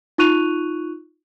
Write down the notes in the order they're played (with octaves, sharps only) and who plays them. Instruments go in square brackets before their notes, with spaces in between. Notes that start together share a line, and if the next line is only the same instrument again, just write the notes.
[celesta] D#4 F4 C#6 F#6 D#7 F7